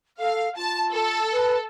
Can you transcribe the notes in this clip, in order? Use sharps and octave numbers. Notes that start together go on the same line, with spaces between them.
A4 F5
F4 A5
A4
B4